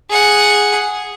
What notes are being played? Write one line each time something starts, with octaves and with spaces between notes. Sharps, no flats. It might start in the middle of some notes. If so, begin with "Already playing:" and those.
G#4 F#5